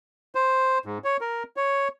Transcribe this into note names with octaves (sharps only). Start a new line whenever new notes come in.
C5
G#2
C#5
A#4
C#5